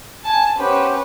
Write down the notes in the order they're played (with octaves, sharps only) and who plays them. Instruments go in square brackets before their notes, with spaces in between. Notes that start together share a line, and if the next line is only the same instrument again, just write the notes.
[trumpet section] G#5 [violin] A5
[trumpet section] B3 G4 C5 [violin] C#4 B4